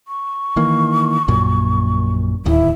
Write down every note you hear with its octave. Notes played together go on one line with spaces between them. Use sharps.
C#6
D#3 E3 A#3
A#1 F#2 A#2
D1 D#2 E4